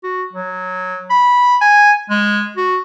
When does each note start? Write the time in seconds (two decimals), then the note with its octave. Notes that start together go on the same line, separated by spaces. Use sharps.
0.04 F#4
0.33 F#3
1.10 B5
1.61 G#5
2.10 G#3
2.57 F#4